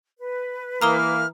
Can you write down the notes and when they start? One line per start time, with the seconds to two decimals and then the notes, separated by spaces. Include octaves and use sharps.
0.19 B4
0.82 E3 A#3 A#5 D#6 F6 G7